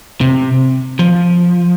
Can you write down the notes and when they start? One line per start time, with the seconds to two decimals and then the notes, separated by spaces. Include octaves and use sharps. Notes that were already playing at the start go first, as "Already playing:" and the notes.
0.21 C3
0.99 F3